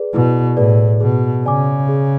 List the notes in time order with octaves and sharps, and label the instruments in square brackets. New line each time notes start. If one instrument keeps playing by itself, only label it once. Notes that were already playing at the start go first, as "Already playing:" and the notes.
Already playing: [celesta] G#4 B4 D5
[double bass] B2 [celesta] E4
[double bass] A2 [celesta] G#4 B4 D5
[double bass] B2 [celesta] G#4
[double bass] C#3 [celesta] D5 G#5 D6
[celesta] G#4